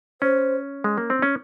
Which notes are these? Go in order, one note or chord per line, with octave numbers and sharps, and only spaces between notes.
C#4 C5
G#3
A#3
C4
C#4